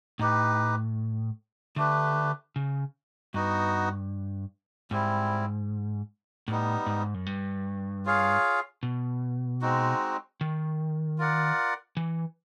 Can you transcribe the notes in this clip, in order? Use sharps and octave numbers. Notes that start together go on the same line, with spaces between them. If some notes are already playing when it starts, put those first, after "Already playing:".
A2 D#4 G4 B4
D3 A3 D4 G4 B4
C#3
G2 B3 D#4 F#4
G#2 G3 C4 E4
A2 G3 B3 D#4
G#2
F#2
G2
F4 G#4 C#5 F5
B2
G#3 C4 D#4 F#4
D#3
F4 A#4 D5 F#5
E3